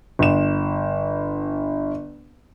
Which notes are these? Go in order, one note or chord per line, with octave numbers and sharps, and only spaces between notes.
G1 E7